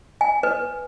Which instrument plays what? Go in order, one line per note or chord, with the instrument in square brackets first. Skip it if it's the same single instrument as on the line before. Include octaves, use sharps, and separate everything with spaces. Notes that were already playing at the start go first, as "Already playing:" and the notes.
[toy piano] G#5
B4